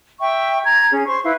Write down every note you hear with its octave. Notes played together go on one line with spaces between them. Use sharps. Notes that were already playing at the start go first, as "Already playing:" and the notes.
E5 G5 C#6
A#5 G#6
C#4 G#4
C5 C6 C#6
E4 B4 F5